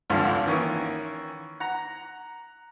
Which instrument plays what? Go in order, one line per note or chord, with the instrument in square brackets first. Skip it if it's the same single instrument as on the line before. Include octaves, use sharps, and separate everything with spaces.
[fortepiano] G#1 C#2 G2 D3 F3
D#3 E3 A#3 C#4
F#5 A#5